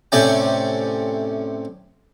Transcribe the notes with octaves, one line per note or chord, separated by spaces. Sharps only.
A2 C3 C#4 D5 G5